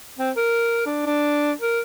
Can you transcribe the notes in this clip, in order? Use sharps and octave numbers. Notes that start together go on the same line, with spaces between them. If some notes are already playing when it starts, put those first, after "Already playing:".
C4
A#4
D4
D4
A#4